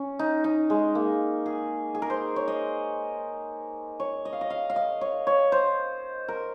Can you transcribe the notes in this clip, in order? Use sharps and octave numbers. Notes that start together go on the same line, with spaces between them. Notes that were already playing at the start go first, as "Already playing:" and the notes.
Already playing: C#4
D#4
D#4
G#3
A#3
G#4
G#4
A#4
C5
C#5
D#5
C#5
D#5
F5
D#5
F5
F5
D#5
C#5
C#5
C5
A#4